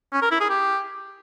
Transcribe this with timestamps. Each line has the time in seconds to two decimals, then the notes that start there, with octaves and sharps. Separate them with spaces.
0.13 C#4
0.22 A#4
0.31 E4
0.40 G#4
0.49 G4